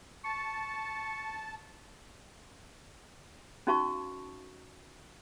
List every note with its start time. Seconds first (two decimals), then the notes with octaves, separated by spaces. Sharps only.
0.25 A5 C#6
3.67 C#4 D#4 F#4 F5 A5 C#6